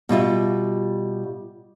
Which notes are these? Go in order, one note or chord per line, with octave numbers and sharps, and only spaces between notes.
B2 G3 F4 E5